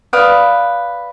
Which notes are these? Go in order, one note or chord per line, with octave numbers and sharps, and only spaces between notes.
B4 D5 F5 D#6